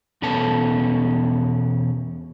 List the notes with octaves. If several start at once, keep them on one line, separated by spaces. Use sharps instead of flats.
E2 B2 B3 C#4 A4 A5